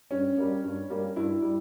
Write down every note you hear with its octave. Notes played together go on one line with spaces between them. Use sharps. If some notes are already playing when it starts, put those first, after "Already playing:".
G2 C#4
G3 A#3
G2
G3 A#3
G2 E4
G3